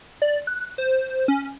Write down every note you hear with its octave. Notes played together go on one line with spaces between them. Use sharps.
D5
F#6
C5
C#4